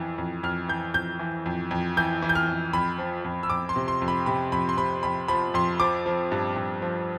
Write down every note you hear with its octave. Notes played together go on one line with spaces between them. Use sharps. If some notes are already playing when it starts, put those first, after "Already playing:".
Already playing: F2 E3
F2
F2 F6
E3 G6
F2 G6
E3
F2
F2
E3 G6
E3
G6
F6
F2
F2 B5
F3
F2
E6
F2 D6
C6
C3
C6
F2
B5
C3 B5
F2 B5
C6
C3 B5
F2 B5
F3 B5
F2 C6
F3 D6
F3
G2
G2
F3